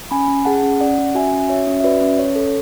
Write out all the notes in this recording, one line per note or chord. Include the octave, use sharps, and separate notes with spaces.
C#4 G#5 B5
C#4
G#4 F#5 A5
C#4
C#4 D5 F#5
C#4
F#4 E5 G#5
C#4
F#4 C#5 E5
C#4
E5
F#4 B4 D5
C#4
C#4 C#5
A4